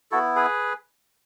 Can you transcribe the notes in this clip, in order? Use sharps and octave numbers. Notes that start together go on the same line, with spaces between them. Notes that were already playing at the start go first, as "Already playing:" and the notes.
B3 E4 F#4 A4
G#4 B4